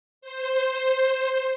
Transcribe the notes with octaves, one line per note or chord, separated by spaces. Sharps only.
C5